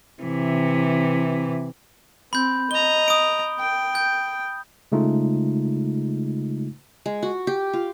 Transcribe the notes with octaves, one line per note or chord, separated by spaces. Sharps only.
C3 E3
C4 B5 G6
D#5 A#5 G7
D#6 D7
G5
G6
C#3 G#3 A3 D#4 F4
G#3
F#4
G4
F4